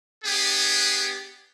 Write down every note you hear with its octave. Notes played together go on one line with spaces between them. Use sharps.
B3 D4 G4 G#4